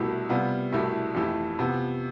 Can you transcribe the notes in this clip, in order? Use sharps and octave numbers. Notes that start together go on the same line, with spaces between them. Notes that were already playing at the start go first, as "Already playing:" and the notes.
Already playing: C2 B2 A3 E4 G4
C3 G3 B3 F4
C2 B2 A3 E4 G4
F2 E3 A3 E4 G4
C3 F3 B3